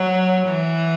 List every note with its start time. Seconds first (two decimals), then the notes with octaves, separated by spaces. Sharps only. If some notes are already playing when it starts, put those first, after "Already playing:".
Already playing: F#3
0.46 E3